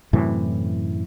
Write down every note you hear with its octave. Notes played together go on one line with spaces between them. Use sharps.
F#2 A2 C3 E3